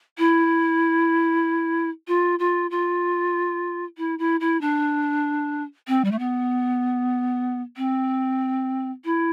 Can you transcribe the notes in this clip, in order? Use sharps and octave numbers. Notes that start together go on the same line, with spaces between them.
E4
F4
F4
F4
E4
E4
E4
D4
C4
G3
A3
B3
C4
E4